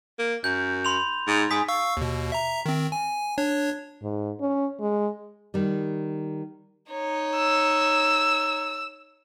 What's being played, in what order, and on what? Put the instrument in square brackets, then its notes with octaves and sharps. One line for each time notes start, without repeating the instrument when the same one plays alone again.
[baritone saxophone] A#3
[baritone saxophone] F#2 [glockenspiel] G6
[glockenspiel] B5 C6 F7
[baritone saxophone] G#2
[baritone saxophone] G#2 [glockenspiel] G#5 D#6 B6
[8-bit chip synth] F5 C#6 E6
D#2 B2
E5 A#5
D#3 C4
G#5
D4 C#5
[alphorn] G#2
C#4
G#3
[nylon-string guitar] D#3 G3
[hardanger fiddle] D#4 C#5
[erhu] E6